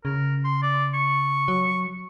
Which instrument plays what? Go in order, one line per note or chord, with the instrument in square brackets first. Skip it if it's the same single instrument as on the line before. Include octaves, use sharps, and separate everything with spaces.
[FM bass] C#3 [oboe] A#4
[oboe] C6
D5
C#6
[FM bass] F#3